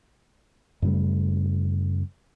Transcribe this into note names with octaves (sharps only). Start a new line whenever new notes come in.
F#2 C#3 G3 A3